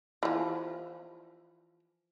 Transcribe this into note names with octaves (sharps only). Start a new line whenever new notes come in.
E3 F3